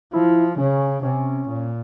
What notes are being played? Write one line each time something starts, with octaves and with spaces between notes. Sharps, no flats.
F3 E4
C#3 C#4
C3 C#4
A#2